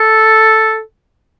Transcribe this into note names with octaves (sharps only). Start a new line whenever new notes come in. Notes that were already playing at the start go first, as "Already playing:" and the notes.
Already playing: A4